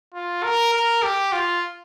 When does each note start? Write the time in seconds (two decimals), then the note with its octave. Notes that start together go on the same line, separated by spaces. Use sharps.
0.14 F4
0.44 A#4
0.74 A#4
1.03 G4
1.33 F4